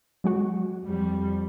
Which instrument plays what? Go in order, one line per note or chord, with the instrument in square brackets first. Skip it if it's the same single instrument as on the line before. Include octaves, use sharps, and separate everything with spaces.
[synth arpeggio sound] F#3 G#3 F#4
[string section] F2 G3